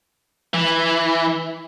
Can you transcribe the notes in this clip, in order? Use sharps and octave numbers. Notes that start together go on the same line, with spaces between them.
E3